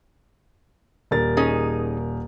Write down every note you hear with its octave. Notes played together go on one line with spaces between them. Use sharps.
D#1 A#4 A6
C#4 D#4 G#4